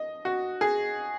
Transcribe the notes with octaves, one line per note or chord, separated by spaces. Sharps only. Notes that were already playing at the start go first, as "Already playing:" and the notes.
Already playing: D#5
F#4
G#4